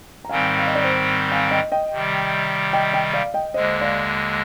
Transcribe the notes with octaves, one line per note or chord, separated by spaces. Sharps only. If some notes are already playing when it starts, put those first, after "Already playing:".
A#5
G#2 D#3 G3 C4 F5 G#5
F5
D#5
D5
C5
F5 G#5
D#5 G5
D#5 G5
C3 D#3 G3
D#5 G5
D#5 G5
D5 F5
D#5 G5
D#2 D3 G#3 C5 D#5
D5 F5